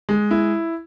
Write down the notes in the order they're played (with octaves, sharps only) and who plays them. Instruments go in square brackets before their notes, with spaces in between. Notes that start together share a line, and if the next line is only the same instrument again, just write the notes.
[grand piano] G#3
E4